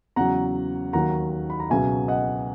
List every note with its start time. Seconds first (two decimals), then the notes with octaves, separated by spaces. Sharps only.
0.16 E2 C#3 F#3 F#5 A#5
0.93 D#2 D#3 F#3 F#5 A#5
1.50 B5
1.60 A#5
1.70 C#2 B2 F#3 E5 G#5
2.08 D#5 F#5